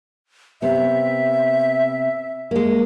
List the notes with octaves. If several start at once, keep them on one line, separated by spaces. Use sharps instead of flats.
C3 B3 E5
G#3 A#3